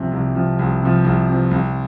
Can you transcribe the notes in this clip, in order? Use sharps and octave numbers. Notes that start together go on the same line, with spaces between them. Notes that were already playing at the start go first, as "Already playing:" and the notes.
Already playing: C2 C3 F3
C2
C3 F3
C2
C3 F3
C2
C3 F3
C2